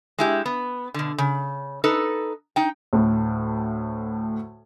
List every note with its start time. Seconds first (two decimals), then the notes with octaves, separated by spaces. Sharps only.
0.19 G#3 E4 G4
0.46 B3
0.94 B2 D3
1.18 C#3
1.84 D#4 A4 B4
2.56 D#4 G5
2.93 D2 A2